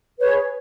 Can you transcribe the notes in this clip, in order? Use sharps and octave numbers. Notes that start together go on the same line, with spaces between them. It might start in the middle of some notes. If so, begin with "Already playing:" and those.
G#4 B4 C#5